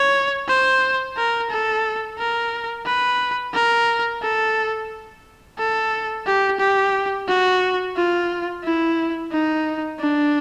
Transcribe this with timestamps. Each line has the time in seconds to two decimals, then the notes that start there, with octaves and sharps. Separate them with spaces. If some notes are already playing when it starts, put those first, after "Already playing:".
Already playing: C#5
0.48 C5
1.17 A#4
1.50 A4
2.19 A#4
2.86 B4
3.54 A#4
4.22 A4
5.59 A4
6.26 G4
6.59 G4
7.28 F#4
7.96 F4
8.64 E4
9.32 D#4
9.99 D4